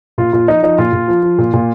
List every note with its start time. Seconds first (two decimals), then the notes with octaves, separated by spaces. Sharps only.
0.18 A#2 F4
0.33 A#2 F4
0.48 F3 D#4
0.63 F3 D#4
0.78 A#2 F4
0.93 A#2
1.08 F3
1.23 F3
1.38 A#2
1.54 A#2